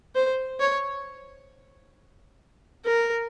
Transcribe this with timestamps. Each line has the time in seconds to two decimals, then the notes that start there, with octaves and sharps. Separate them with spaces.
0.15 C5
0.60 C#5
2.85 A#4